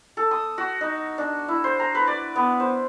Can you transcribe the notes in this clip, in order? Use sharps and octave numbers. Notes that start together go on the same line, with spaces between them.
A4
D#6
F#4
D#4
D4
E4
C5
A#5
B4
D5
B3
C5